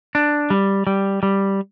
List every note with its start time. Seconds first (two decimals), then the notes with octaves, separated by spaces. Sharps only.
0.15 D4
0.50 G3
0.87 G3
1.23 G3